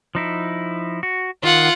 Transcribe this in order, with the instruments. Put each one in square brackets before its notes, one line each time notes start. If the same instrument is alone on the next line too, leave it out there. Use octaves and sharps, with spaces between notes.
[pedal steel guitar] F3 D#4 E4
F#4
[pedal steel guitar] D#3 [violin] F4 F#5